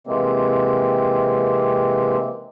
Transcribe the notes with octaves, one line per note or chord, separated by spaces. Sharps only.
C3 E3 G#3 A#3 C4